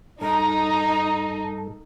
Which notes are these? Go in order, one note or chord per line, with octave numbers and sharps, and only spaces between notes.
G2 D#4 A4 A#5